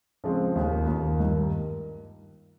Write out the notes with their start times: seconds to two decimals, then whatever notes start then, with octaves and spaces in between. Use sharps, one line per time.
0.24 C#3 F3 G#3 C4 F4
0.55 D#2 D#3 A#3 F4
0.87 D#2 D#3 A#3 F4
1.20 G2 D#3 A#3